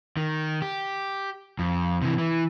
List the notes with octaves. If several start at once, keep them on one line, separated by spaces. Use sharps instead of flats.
D#3
G4
F2
C3 E3
E3